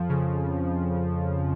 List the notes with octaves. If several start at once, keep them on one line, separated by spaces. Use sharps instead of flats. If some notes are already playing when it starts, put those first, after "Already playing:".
Already playing: F2 F3
C#3